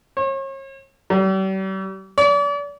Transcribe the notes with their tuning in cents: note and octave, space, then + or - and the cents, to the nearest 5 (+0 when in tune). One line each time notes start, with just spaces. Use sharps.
C#5 -40
G3 -40
D5 -40